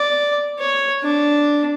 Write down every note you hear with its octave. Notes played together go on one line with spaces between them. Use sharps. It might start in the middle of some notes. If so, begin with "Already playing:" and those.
Already playing: D5
C#5
D4